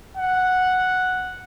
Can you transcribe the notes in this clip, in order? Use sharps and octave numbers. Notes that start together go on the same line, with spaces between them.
F#5